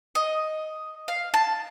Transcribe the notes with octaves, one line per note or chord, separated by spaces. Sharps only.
D#5
F5
A5